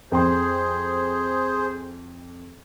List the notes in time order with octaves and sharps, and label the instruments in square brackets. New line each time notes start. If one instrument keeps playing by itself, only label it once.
[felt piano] F2 G5 C6 [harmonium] G#4 C5